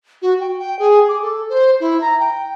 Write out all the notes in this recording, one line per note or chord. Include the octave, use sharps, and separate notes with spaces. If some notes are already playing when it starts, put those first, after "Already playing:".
F#4
G5
G5
G#4
D6
A4
C5
E4
A#5
G5